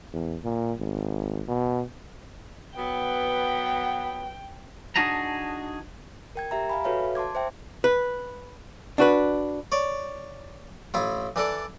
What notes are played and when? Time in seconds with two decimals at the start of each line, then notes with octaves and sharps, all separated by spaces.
0.13 E2
0.44 A#2
0.80 G#1
1.48 B2
2.77 F#3 B3 G5
4.96 D4 D#4 F#4 G#4 A5 A#5
6.35 A#4 G5 G#6
6.51 G4 E5 A#5
6.70 F5 G#5 B5
6.84 F#4 A4 B4 C#5 E5 F5
7.15 A5 C6 D6 G#6
7.35 C5 E5 G5
7.84 B4
8.98 D4 F#4 B4
9.72 C#5 D5
10.94 A1 E4 F4
11.36 E3 D4 A4 D5